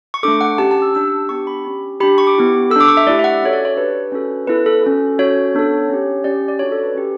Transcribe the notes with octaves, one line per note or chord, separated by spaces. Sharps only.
C#6
A3 D4 A4 D6
F#5
C#4 G4 A5
A5
E6
D4 G4 E6
B3 D4 G4 C#6
B5
C#4 G4
D4 G4 B5
C#6
D6
B3 E4 G4
A4 E6
D4 D6
C#6
E5
A3 E4 G4 D5
E5
F#5
C#4 F#4 A4 C#5
D5
C#5
D4 G4 B4
C#4 F#4 A4
B3 E4 A4 B4
A4
C#4 F#4 A4
C#4 F#4 A4 C#5
B3 D4 A4
C#4 G4
C#4 G4 D5
D5
D4 F#4 A4 C#5
A4
B4
C#4 G4